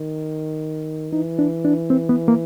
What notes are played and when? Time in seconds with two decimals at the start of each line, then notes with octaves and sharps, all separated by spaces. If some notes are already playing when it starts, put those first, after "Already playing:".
Already playing: D#3
1.13 E3 D#4
1.39 D4
1.64 D4
1.90 C4
2.09 B3
2.28 A#3